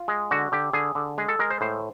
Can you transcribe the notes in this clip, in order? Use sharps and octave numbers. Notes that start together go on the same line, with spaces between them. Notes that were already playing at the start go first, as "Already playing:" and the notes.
Already playing: F4
G#3
D3 F#4
D3 G4
D3 G#4
D3
G#3 G#4
A4
G#3 A#4
C5
A2 C5